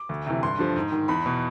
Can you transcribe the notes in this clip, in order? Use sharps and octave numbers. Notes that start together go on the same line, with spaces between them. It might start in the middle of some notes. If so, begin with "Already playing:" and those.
Already playing: D6
D2
C3 E3
G2 C6
D3 F3
G#2
D#3
E2 B5
B2